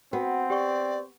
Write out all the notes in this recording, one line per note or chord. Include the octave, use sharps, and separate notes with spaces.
B3 C4 F#4 F#5
G4 D5 G5 C#6